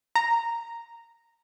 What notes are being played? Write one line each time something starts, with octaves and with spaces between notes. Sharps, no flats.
A#5